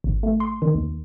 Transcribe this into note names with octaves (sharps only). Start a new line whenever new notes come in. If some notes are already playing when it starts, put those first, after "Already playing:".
G#1
A3
C6
D#3
D#2